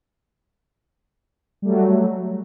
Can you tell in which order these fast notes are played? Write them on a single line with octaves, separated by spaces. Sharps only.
G3 A3 F#3